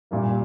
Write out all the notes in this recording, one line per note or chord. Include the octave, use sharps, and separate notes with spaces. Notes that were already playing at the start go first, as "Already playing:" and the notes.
A#2 G3 A#3